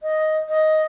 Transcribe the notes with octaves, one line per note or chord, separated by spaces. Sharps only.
D#5
D#5